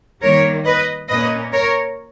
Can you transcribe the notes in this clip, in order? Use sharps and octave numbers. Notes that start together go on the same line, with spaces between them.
D#3 G3 A#3 A#4 C#5
B4 D#5
A#2 A#3 C#4 B4 D#5
A#4 C#5